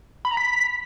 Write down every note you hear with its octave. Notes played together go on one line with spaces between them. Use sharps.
B5
A#5
B6